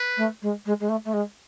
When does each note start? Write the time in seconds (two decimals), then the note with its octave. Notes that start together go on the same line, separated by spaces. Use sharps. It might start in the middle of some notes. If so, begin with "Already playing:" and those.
Already playing: B4
0.17 A3
0.42 G#3
0.65 G#3
0.80 G#3
0.89 A3
1.05 A3
1.13 G#3